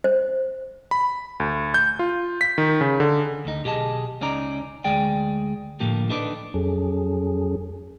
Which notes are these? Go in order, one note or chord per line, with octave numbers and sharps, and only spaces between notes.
C5
B5
D2
G6
F4
B6
D#3
C#3
D3
D2 D#4
B1 G4 G#4 D#5 A5
C#2 C#4 D#4 D5 A#5
D2 G#3 G#4 D5 G5
A2 D3 F3 A#3 G4 A4
D4 D#4 A4 B4 C#5 D5
F2 F#3 C#4 G#4 A4